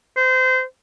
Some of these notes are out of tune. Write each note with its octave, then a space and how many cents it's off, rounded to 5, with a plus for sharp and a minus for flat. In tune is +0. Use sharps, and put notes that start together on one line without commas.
C5 -25